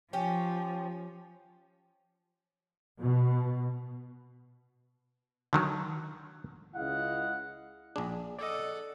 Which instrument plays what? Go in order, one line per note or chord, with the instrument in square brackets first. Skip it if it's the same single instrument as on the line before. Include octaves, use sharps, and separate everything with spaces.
[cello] F3 [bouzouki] C#4 G4
[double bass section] B2
[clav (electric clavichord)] D3 D#3 F#3
[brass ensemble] C#2 G#3 E4 D#5 F5 F#5
[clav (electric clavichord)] A#1 D4 [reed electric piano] G#4
[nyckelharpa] A4 F#5 [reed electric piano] D5 D#5